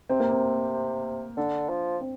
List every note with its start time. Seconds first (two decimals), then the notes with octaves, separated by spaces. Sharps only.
0.09 C3 C4
0.20 A#3
0.30 C4
1.37 D3 D4
1.69 F3
2.01 C4